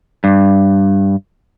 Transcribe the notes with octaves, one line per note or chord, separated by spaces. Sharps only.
G2